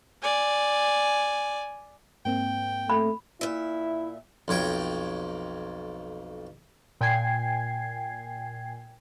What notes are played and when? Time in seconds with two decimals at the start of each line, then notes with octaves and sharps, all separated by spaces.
0.23 D5 G#5
2.25 G#2 A#3 C4 G5
2.90 A3 B5
3.41 A#2 E4 E5
4.48 B1 F2 C#5 G5
7.01 A#2 G5 G#5 G#6 C7